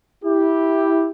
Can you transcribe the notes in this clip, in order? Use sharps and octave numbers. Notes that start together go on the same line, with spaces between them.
E4 G4